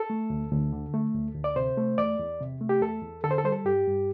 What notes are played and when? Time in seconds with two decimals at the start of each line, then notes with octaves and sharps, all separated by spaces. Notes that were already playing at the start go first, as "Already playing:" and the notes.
Already playing: A4
0.10 A3
0.30 D2
0.52 D2
0.73 D3
0.94 A3
1.14 D2
1.35 D2
1.44 D5
1.56 C3 C5
1.77 A3
1.98 E2 D5
2.19 E2
2.40 C3
2.61 A3
2.69 G4
2.82 E2 A4
3.02 E2
3.24 D3 A4
3.31 C5
3.38 A4
3.44 G3 C5
3.52 A4
3.65 G2 G4
3.87 G2